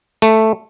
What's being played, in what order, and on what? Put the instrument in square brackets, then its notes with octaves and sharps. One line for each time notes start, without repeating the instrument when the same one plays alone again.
[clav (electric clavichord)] A3